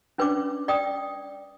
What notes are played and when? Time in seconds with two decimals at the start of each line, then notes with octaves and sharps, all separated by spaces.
0.18 C#4 D4 B4 C#5 D5 D6
0.68 D5 G5 D#6